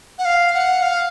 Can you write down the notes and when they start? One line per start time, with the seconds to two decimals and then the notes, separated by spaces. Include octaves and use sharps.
0.19 F#5
0.25 F5
0.54 F#5
0.82 F5